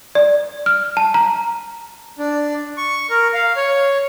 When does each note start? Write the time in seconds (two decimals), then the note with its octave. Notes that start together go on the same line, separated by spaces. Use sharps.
0.15 D5
0.66 F6
0.97 A5
1.14 A#5
2.19 D4
2.77 C#6
3.10 A#4
3.34 F5
3.56 C#5